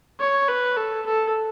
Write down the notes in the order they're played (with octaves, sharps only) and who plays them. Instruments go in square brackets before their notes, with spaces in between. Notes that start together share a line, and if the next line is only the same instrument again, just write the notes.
[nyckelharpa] C#5
B4
A4
A4